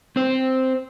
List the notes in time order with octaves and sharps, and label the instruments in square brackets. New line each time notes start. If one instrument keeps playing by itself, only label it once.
[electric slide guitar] C4 C5